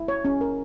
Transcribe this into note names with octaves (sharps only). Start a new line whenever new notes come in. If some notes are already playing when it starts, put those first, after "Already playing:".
Already playing: E4
C#5
C#4
A#4